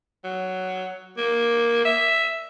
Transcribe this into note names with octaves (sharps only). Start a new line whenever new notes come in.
F#3
A#3
E5